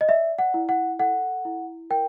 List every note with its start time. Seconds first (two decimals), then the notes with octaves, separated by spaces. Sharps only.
0.01 D#5
0.08 D5 E5
0.39 F#5
0.54 E4
0.69 F#5
0.99 A4 F#5
1.45 E4
1.90 A#4 G5